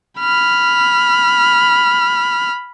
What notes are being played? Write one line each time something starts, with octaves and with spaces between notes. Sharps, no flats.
B5 F6